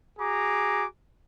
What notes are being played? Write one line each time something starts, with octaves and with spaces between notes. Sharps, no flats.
F#4 G#4 A#5 D6